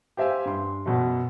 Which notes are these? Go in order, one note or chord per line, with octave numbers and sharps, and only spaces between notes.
G4 C5 E5 F5 G#5
G2 C6
F#2 B2